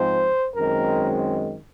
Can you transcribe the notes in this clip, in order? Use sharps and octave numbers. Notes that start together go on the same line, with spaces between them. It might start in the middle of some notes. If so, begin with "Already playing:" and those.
Already playing: G#2 F3 G#3 C4 C5
F#2 D#3 G#3 C4 A#4